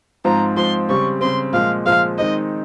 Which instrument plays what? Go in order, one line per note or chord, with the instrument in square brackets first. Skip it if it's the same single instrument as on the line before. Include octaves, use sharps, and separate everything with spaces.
[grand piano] G#2 F3 C4 F4 [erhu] A#5
[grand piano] G#2 F3 C4 F4 [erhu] C6
[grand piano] C#3 G3 C4 [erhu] C#6
[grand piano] C#3 G3 C4 [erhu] C6
[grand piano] A#2 F3 G#3 [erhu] F5
[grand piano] A#2 F3 G#3 [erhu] F5
[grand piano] D#3 G#3 C4 D#4 [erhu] D#5